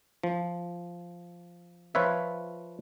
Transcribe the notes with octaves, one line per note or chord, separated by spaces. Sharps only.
F3
F3 F4 B4 C#5 E5